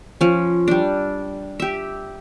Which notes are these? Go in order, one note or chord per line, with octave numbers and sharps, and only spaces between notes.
F3 C#4
G3 D4
G4 E5